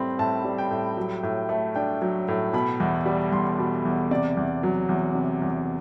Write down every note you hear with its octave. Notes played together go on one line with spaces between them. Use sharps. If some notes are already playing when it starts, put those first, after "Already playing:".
Already playing: A2 G3 C4 B5 C6
A2 A5
G3
G5
A2
F#3
A2
A3
D4 G5
F#3
A2
B2 B5
E2
G3
E2 C6
B2
E2
C3 D5
E2
F#3
E2
C3
E2